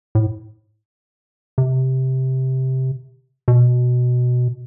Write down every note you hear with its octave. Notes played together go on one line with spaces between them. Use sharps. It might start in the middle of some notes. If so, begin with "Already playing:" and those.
A2
C3
B2